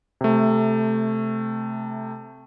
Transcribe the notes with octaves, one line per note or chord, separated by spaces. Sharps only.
C3 A3